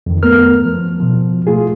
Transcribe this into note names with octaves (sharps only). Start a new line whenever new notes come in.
F2 D#3
A3 B3 A#4 F6
F3
B2 F3
A3 F4 G#4